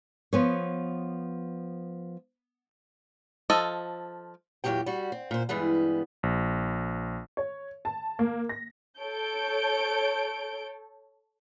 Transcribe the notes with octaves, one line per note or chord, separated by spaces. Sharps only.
F3 B3 C#5
F3 A4 D#5
E2 A#2 D#3 F#3 G4 G5
G3 F#4
C4
A#2 C5
G2 E3 G3 G#3 B3
A#1
C#5
A5
A#3
A#6
A4 C#5 G6 D7